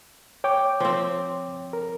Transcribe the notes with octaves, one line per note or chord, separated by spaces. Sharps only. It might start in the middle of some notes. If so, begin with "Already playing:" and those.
C#5 G5 D6
F3 C4
A#4